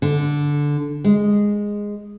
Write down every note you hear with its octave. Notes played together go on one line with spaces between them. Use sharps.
D3
G#3